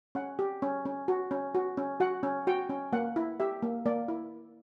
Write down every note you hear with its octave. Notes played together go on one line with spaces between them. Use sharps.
C#4 F#5
G4
C#4
C#4
F#4
C#4
F#4
C#4
F#4 F#5
C#4
F#4 G5
C#4
A#3 F#5
E4
G4 E5
A#3
A#3 D5
E4